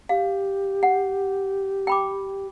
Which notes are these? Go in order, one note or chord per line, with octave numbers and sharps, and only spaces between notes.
G4 F5
F#5
G5 B5 D6